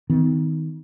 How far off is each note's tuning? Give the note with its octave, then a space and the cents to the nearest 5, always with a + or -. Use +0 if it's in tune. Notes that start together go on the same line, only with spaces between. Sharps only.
D#3 +25 B3 +45